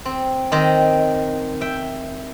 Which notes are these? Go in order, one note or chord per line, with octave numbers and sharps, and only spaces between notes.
C4
D#3 C4 D#5
E5 G5